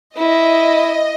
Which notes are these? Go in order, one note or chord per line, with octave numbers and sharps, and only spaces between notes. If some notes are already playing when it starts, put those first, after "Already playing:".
E4 D#5